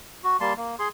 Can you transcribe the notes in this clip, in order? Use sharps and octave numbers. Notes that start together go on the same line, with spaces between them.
F#4
G3 A#3 A5 C6
A#3
G#4 C6